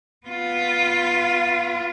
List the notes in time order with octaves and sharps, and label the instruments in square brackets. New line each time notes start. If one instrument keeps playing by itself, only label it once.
[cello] B3 F4